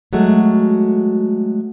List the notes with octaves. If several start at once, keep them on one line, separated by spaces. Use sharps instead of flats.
F#3 G#3 A3 F#4